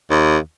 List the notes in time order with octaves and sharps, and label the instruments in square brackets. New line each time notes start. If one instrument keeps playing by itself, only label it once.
[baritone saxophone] D#2